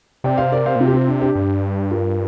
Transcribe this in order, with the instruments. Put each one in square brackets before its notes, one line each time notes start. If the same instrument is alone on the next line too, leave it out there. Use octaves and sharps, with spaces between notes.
[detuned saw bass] C3 [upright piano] D5 G5
[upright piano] C5 F5
A#4 D5
C5 F5
[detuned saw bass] A#2
[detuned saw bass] C3 [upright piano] C4 F4
[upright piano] G4
C4 F4
D4
D4 G4
[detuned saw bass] G2
[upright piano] F4 A#4